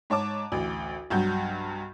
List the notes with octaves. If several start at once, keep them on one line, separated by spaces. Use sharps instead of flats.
G#2 C#5 A5 D6
A1 D2
B1 G2 F#3 F#4 G6